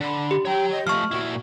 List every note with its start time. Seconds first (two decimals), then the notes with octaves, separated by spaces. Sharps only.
0.01 D3 B5
0.31 G4
0.45 C#5 G5 A#5
0.71 D#5
0.87 F3 A3 D#5 C#6 F6
1.11 A#2 E4 F#4